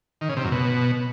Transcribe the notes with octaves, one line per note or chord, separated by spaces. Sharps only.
D#3
C#3
C3
F#2
B2